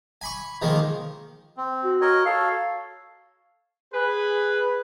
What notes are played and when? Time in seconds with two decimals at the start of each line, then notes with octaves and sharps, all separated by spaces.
0.21 G#5 B5 C#6
0.62 D#3 F3 G#3 A#3
1.57 C4
1.84 F#4
2.01 A#4 C#5 D#5
2.26 A4 C#5 F5
3.94 G#4 B4